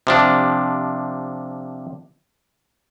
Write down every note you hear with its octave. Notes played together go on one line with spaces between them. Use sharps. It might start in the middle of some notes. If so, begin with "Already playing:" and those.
C3 F3 D4